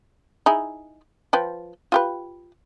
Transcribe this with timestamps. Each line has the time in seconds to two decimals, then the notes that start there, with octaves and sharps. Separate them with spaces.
0.46 D#4 E4 G#4
1.33 F3 B4 G5
1.92 F4 G4 B4